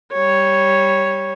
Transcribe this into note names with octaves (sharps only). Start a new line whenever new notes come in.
G3 C#5